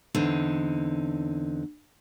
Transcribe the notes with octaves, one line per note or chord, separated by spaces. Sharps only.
E2 D3 C4 D#4